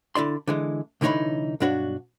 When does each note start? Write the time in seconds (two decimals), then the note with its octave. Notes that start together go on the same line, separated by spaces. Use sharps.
0.15 D3 E4 D5 C6
0.48 D3 E3 G#3
1.01 C2 D3 E3 D#4 C#5 B5
1.60 B1 G2 D4 F#4 C#5